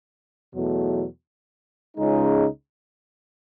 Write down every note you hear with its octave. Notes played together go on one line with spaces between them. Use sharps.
E2 B2 F#3 A3
C#2 C#3 G#3 D#4